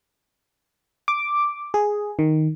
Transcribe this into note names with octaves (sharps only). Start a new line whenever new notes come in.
D6
G#4
D#3